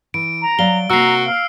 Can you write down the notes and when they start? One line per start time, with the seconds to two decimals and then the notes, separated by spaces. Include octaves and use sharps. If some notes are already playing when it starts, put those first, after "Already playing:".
0.14 E3 D7
0.42 A#5
0.59 F#3 D5 F5 G7
0.90 C3 A#3 F#4 A#5 E6 C7
1.26 F5